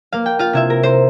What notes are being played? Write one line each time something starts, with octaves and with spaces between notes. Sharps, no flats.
A#3 F5
G5
F4 F5
C3 E4 E5
A#4
C5